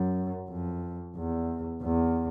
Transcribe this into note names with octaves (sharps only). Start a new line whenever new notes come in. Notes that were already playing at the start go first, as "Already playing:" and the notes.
Already playing: F#2
F2
E2
E2